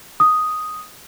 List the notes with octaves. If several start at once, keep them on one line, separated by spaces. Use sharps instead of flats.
D#6